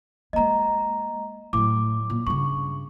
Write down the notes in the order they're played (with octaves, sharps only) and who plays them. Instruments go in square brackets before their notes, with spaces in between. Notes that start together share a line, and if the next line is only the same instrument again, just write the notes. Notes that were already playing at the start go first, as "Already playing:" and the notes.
[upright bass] G#3 A#3 [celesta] D#5 A#5
[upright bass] A2 F#3 [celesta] D6
[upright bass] A#2
[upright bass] G2 C#3 [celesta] C#6